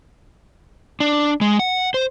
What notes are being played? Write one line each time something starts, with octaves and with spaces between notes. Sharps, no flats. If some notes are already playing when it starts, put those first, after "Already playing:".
D4
G#3
F#5
C5